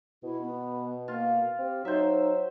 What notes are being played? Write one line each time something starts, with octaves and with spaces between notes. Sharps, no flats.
B2 E4
B3
A#3 F4
C4 G4
F#3 D#4 C5 E5